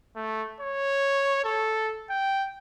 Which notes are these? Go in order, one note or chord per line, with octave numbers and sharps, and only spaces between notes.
A3
C#5
A4
G5